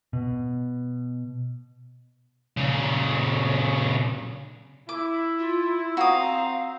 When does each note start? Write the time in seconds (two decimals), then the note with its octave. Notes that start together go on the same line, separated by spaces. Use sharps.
0.13 B2
2.57 A#2 C#3
4.89 E4 D6
5.39 F4
5.97 C4 F#4 F5 A#5 D#6